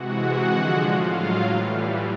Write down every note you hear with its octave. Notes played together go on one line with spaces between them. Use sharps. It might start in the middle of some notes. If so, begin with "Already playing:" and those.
Already playing: C3 E3 G#3 F#4 F#5
D3 F3 G#3
A2 F#3 F4 F5
A2 E3 G3